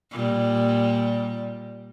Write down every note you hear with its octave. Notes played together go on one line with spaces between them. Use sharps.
A#2 G3